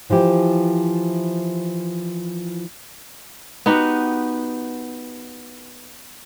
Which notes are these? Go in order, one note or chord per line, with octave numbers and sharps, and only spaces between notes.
E3 F3 E4 G4
B3 D#4 F#4 G4